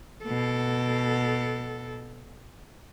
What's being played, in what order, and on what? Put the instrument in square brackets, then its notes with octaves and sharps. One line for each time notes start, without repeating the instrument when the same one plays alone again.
[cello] B2 A4